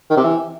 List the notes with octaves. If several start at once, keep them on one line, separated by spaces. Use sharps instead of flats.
D#3
C3
E3